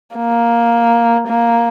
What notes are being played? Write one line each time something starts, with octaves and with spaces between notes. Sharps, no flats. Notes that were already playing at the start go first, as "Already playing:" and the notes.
A#3
A#3